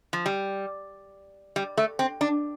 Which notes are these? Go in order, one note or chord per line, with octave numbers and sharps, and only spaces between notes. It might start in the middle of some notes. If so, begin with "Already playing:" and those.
F3
G3
G3
A3
C4
D4